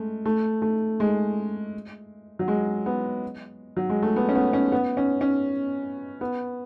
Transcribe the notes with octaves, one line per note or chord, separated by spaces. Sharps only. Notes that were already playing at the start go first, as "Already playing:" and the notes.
Already playing: G#3 A3
A3
A3
G#3
F#3
G#3
B3
F#3
G#3
A3
B3
C#4
B3
C#4
B3
C#4
C#4
B3